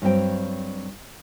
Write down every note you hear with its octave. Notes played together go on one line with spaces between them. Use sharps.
G2 F#3 C4 G5